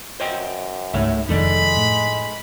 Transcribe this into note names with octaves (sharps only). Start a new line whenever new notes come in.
F#2 C5 D#5 G5
C#2 G#2 A3 C#5 E5
F1 F2 D#3 G#3 D#4 A4 D5 B5
A2